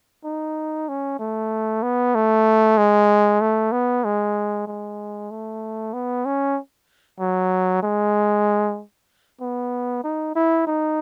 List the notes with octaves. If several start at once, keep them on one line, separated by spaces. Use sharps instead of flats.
D#4
C#4
A3
B3
A3
G#3
A3
B3
G#3
G#3
A3
B3
C#4
F#3
G#3
B3
D#4
E4
D#4